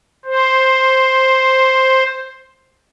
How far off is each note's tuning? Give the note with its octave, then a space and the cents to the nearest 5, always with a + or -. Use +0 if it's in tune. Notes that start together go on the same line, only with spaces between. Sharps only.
C5 +5